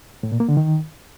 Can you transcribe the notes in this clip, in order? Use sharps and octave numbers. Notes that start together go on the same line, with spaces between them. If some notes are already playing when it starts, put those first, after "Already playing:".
A2
A#2
A#3
D3
D#3